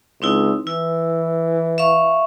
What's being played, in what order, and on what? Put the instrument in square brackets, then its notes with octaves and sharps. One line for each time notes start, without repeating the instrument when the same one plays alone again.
[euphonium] C#2 [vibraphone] C4 D#4 E4
[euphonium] E3 [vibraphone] E4
[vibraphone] E5 F5 C#6